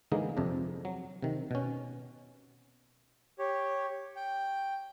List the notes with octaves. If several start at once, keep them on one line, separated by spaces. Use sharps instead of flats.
D3 E3 G#3 A#3 D#4
F2 C3 D4
F#3
C3 D#3
B2 C#4
G4 C#5
G5